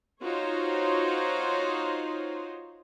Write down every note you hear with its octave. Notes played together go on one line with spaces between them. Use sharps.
D#4 F4 F#4 C5 C#5